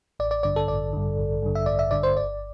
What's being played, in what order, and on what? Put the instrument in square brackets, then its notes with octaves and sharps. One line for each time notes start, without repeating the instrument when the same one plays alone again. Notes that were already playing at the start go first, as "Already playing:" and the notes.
[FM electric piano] A1 D5
D5
G2 D3 D5
A4
A1 D5
G2 D3
A1
G2 D3
E5
A1 D5
E5
G2 D3 D5
C5
G1 D5